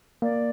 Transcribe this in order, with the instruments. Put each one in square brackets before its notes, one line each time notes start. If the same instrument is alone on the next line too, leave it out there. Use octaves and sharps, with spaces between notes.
[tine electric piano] A#3 [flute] D5